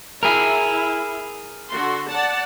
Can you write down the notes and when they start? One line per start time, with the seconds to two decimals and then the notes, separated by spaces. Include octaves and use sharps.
0.23 E4 G#4 A#4 E5
1.69 D3 F#4 C6
2.08 D5 F#5 A5